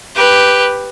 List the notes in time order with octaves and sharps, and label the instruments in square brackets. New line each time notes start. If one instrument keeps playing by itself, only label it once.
[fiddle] G4 B4